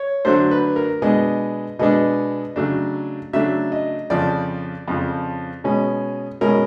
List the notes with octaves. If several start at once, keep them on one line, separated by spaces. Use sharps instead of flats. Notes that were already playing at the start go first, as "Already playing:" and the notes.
Already playing: C#5
D3 F#3 A3 D4 C5
B4
A#4
B2 G#3 B3 D4 D#5
B2 G#3 B3 D4 D#5
C#3 F#3 A3 D4
C#3 F#3 A3 D4 E5
D#5
F2 C#3 F3 D5
F2 C#3 F3
B2 G#3 C#4
B2 G#3 C#4 A#4